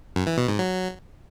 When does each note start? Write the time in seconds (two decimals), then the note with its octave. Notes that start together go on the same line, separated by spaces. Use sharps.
0.16 F#2
0.27 E3
0.38 B2
0.48 G#2
0.59 F#3